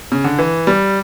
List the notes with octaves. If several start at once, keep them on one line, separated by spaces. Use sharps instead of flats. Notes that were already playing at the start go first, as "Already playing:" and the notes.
C#3
D3
E3
G3